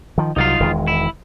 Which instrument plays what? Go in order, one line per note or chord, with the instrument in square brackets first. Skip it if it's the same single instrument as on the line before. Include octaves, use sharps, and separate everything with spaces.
[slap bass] D#3 F3
[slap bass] C2 F#3 [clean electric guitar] D#4 F4 F5
[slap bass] E1 D#3 G#3
[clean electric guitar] E4